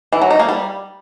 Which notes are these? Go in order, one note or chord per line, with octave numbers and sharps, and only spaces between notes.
E3
F#3
D#4
A#3
G3